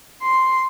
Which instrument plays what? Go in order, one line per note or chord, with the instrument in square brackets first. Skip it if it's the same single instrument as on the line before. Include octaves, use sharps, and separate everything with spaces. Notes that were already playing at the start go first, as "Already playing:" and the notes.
[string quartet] C6